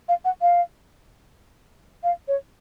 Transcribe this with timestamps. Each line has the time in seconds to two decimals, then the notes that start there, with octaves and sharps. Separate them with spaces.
0.08 F5
0.25 F#5
0.41 F5
2.03 F5
2.28 C#5